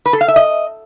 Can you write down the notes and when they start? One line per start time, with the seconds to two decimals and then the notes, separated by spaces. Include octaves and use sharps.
0.06 B4
0.13 A4
0.21 F5
0.28 E5
0.36 D#5